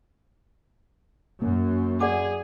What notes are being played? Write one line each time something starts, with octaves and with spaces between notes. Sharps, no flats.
F#2 A#3
G#4 D5 F#5 D6